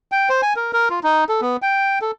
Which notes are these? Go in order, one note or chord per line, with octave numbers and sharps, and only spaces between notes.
G5
C5
G#5
A#4
A#4
F4
D#4
A4
B3
G5
A4